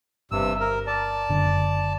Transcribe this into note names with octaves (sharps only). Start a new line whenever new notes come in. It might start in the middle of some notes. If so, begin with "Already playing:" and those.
G1 G2 C3 E6
A#4
D5 A5
F#1 D3 D4